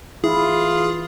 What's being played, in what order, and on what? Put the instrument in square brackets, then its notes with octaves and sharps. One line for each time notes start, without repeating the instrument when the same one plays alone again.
[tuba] E3 [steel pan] E4 [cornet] F4 [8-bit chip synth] G#4